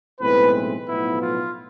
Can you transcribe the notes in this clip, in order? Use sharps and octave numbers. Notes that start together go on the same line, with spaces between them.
B1 A2 E3 G#3 C4 B4
B1 A2 F3 B3 E4
F4